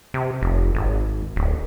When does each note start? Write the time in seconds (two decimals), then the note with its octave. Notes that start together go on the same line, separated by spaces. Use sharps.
0.14 C3
0.41 F1
0.75 G#1
1.36 D1